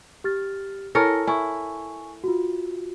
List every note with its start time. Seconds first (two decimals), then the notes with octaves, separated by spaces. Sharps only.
0.24 G4 F6 A6
0.95 E4 A4 A#4 C#5 G#5 A#6
1.27 E4 G#5 C#6
2.24 F4 F#4